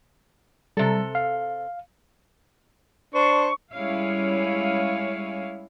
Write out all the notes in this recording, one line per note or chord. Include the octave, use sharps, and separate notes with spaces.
C3 G3 A4
F5
D4 C5 C#6
G3 G#3 C#4 E4 C#5 F5